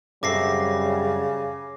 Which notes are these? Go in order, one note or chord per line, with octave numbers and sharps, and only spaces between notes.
F#2 C#3 G3 C4 A4 D6 A#6 C7